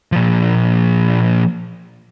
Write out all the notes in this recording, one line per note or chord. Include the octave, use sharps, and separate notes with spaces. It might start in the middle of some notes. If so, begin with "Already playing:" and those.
A#2 F3